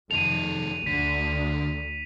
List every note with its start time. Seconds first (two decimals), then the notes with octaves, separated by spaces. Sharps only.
0.11 F1 D#3 A4 D#7 F7
0.86 D2 D3 B6